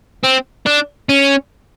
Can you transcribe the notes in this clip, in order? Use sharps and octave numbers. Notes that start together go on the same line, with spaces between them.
C4
D4
C#4